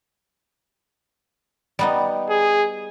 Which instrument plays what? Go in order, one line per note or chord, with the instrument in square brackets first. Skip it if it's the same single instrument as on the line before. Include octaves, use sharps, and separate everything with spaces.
[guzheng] G3 B3 D#4
[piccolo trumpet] G#4